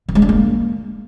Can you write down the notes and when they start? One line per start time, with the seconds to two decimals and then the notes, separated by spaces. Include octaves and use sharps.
0.09 E3
0.15 G#3
0.22 D4
0.29 A#3